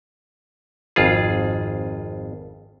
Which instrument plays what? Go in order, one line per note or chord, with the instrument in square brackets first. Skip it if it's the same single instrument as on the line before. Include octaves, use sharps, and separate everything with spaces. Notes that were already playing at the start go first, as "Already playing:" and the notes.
[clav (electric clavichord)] G#1 F2 F4 G#4